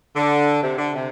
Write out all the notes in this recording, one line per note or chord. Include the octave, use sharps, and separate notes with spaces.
D3
C3
D3
C3